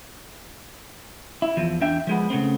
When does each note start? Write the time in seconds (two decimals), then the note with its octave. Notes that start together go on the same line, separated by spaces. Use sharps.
1.42 E4
1.57 E2 F3
1.81 E2 D4 E5 G5
2.07 F3 G#3 B3
2.30 C#3 A3 B3 C4